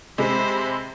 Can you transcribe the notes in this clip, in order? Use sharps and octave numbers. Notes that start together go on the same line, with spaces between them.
C3 G#3 C5 B5